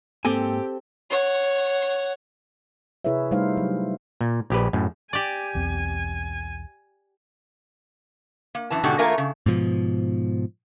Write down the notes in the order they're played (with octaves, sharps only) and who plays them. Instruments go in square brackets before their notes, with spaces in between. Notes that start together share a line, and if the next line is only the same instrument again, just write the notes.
[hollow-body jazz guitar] G#2 A#3 G#5 [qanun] C4 A4 [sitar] G4
[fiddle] C#5 F#5
[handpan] C3 E4 G#4 B4 C#5 E5
G3 A3 D4 D#4 C5 F5
F#3
[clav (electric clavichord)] A#2
A#1 G4 B4
F#2 A2
[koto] G4 D5 [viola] G#5
[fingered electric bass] B1 E2 C4
[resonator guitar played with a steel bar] A#3
F#2 E3 A5
G#2 B2 D3 F#4 G4
E2 A3 A#3 F4 A#4 G#5
C#3
[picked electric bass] G#2 B2 F3